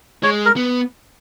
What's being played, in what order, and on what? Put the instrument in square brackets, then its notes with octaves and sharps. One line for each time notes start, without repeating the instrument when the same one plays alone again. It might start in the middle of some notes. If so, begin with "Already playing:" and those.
[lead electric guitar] G#3 [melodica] C#5
[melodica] A#4
[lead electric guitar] B3